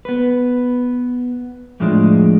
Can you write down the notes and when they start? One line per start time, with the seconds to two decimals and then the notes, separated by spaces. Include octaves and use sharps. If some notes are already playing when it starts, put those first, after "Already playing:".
0.05 B3 B4
1.80 F2 A2 F3 G#3 D4